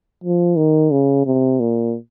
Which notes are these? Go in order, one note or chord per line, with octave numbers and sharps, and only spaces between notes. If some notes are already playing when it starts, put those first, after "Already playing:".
F3
D#3
C#3
C3
A#2